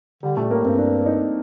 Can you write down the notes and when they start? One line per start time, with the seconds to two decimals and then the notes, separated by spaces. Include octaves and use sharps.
0.23 D3 G3
0.37 A#2 A3
0.50 A2 A#3
0.64 G2 C4
0.78 D4
1.06 D#4